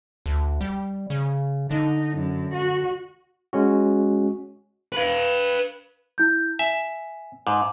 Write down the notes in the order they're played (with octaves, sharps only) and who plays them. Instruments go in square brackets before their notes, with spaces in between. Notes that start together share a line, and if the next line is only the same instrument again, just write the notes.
[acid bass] D2
G3
C#3
[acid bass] D3 [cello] D#4
[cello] F#2
F#4
[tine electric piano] G#3 C#4 F#4
[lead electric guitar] B4 F5
[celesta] E4 G6
[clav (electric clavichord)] E5 [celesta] G#5
[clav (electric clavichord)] G#2 [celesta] D6